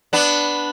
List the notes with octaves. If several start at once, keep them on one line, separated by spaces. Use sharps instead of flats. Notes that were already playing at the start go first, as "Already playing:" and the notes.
B3 D4